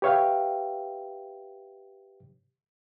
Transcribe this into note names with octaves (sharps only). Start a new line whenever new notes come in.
G4 B4 C#5 E5 F5 G5